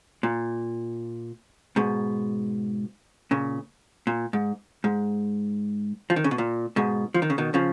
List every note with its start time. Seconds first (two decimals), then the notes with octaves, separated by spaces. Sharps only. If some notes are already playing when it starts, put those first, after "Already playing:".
0.23 A#2
1.76 G#2 B2
3.31 A#2 C#3
4.07 A#2
4.33 G#2
4.84 G#2
6.10 F3
6.16 D#3
6.24 C#3
6.31 B2
6.38 A#2
6.76 G#2 B2
7.14 F3
7.22 D#3
7.30 C#3
7.38 B2 D#3
7.54 C#3 F3